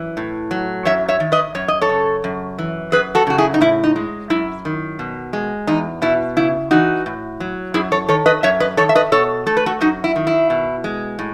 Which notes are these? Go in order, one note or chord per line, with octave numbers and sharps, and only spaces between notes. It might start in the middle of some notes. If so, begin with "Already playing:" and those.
Already playing: F#2 E3
A2
F#3
F#2 C#5 E5
C#5 E5
D#3
B4 D#5
F#2 C#5
D#5
A4 C#5
C#3
F#2
E3
F#2 G#4 B4
F#4 A4
C#3 F#4
E4 G#4
D#4
A2 E4
D#4
G#3
F#2 E4
D#3
B2
G#3
E2 D#4
B2 E4
C#3 E4
E3 D#4 F#4
A2
F#3
F#2 E4 G#4
A4 C#5
D#3 A4 C#5
B4 D#5
F#2 C#5 E5
B4 D#5
D#3 A4 C#5
E5
B4 D#5
B2 A4 C#5
A3 A4
B4
F#4 A4
F#2 D#4 F#4
E4
D#3
E4
B2
G#3
A2